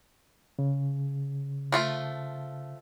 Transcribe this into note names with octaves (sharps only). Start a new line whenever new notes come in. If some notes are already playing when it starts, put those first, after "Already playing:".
C#3
F3 A3 F4